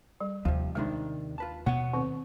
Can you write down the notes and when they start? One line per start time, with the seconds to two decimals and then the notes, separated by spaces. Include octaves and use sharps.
0.20 G3
0.45 D#2 C3 F3
0.75 C3 D#3 G#3 D4 D#4
1.38 F4 B4 A5
1.66 B2 B3 C#5 F#5
1.93 D#3 C4